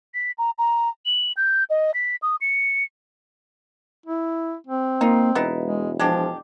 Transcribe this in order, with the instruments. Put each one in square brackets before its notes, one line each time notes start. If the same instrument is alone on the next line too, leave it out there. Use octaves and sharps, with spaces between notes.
[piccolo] B6
A#5
A#5
F#7
G6
D#5
B6
D#6
C#7
[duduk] E4
C4
[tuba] A#3 [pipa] D#4 F4
[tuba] E1 [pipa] B3 D#4 E4
[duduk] G#3
[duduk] F3 [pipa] G#3 D4 G4